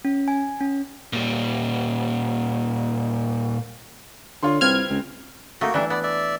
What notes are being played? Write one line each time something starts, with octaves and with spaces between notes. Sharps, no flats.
C#4
G#5
C#4
A#2 G3
D3 F4 C#5 C6
C2 C4 F4 B4 F6 G#6
C#2
A3 A#3 D#4 F#4
E3 G3 D4 E4 E5
B3 D5
D5 E5